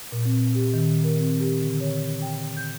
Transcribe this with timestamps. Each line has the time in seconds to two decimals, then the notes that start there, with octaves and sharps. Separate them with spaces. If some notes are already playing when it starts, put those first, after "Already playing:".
0.12 A#2
0.25 C4
0.55 G4
0.74 D#3
1.04 A#4
1.20 C4
1.40 G4
1.61 D3
1.80 C#5
2.22 G5
2.57 G6